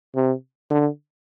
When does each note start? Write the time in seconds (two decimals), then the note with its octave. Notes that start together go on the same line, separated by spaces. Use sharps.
0.16 C3
0.71 D3